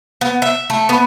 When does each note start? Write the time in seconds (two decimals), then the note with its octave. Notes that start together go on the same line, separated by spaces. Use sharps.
0.21 B3
0.42 E5
0.70 A3
0.89 B3